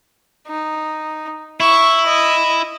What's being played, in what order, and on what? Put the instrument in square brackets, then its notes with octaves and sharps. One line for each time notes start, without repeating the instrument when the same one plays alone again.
[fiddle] D#4
[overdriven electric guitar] E4 [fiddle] C#6
[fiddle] D#5